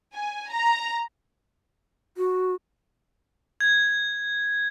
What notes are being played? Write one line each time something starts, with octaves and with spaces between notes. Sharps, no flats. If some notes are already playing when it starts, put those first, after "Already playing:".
G#5
A#5
F#4
G#6